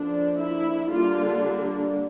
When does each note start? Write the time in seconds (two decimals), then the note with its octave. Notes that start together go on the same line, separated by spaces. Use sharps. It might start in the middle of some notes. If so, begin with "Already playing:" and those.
Already playing: D3 F3 A#3 D4
0.40 E4
0.92 D3 G3 A#3 D4 F4